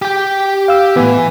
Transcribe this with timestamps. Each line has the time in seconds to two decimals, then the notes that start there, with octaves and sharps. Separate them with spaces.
0.02 G4 G5
0.68 F5 E6
0.96 A2 E3 B3